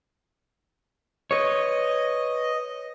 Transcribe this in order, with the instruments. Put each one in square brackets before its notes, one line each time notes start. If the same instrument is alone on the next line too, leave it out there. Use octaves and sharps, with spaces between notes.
[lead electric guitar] B4 C#5 [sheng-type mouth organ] D#5